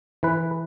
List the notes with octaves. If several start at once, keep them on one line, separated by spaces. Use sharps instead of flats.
E3 B4